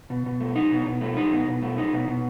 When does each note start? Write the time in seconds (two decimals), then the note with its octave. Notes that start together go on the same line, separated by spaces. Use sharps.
0.10 B2
0.26 B2
0.40 A3
0.56 D#4
0.72 B2
0.86 B2
1.01 A3
1.17 D#4
1.33 B2
1.48 B2
1.62 A3
1.78 D#4
1.93 B2
2.08 B2